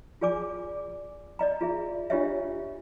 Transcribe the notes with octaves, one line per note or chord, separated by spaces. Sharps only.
F4 G#4 D5 G#5 D6
D5 D#5 A#5
F4 G#4 E5
D4 F4 G4 C#5 D#5 E5